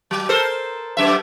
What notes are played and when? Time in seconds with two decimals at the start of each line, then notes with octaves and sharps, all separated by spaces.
0.11 F#3
0.29 A4 A#4 C5
0.97 F#2 E5